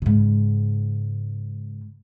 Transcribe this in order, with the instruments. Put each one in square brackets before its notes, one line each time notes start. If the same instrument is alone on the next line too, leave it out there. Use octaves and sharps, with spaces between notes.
[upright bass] G#2 C#3